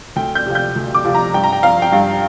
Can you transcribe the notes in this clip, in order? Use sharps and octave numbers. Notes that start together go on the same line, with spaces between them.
D2 G5
G6
C3 F3
G6
D2
D6
C3 F3
A#5
G2 G5
A#5
G5
F3 F5
G5
G2 F5